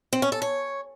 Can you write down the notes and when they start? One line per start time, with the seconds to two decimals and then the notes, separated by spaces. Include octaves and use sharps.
0.13 C4
0.22 C#4
0.32 A4
0.42 C#5